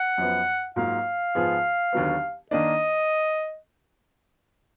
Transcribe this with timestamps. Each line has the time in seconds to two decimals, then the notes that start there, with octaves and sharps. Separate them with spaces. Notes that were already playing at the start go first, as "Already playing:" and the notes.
Already playing: F#5
0.18 F#2 F3 B3
0.76 G#2 F#3 A#3 F4 F5
1.35 G#2 F3 B3 F4 G#4
1.93 D#2 D3 F#3 B3
2.51 D#3 A#3 D4 D#5